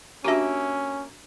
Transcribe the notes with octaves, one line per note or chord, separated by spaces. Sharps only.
A#3 C#4 D4 F#4 G4 E5